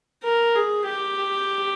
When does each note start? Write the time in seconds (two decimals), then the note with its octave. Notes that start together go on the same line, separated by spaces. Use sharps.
0.24 A#4
0.55 G#4
0.85 G4